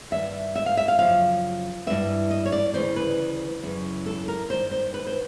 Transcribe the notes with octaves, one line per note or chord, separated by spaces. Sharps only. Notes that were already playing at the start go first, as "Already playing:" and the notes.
G2 D#3 E5
E5
F5
E5
F5
F#2 C#3 F3 F5
G2 E3 E5
D#5
C#5
D5
D2 C#3 E3 C5
B4
F#2 C#3 E3
A4
A#4
G2 D#3 C5
C5
B4
C5